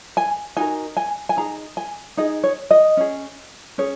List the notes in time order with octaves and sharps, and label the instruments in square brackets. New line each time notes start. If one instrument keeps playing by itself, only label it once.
[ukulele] G#5
D#4 F#4 A#4 G#5
G#5
G#5
D#4 G#4 A#5
G#5
D#4 G#4 D#5
C#5
D#5
C#4 G#4
C#4 G#4 C#5